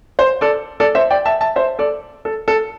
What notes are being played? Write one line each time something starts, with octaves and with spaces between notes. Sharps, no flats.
C5
A4 D5
A4 D5
C5 E5
D5 G5
E5 A5
E5 A5
C5 E5
A4 D5
A4
A4